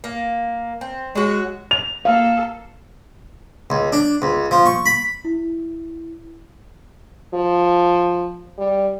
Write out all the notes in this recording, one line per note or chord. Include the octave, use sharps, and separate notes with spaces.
A#3
C4
F#3 G#3 F#4
F7
A#3 A4 F5
C#2
D4
C#2
F3
C#6
B5
E4
F3
G3